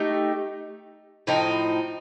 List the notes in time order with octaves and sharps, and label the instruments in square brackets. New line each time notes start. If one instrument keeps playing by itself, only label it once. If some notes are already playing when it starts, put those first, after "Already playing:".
Already playing: [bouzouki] A3 D#4 G4
A2 F3 C4 D#4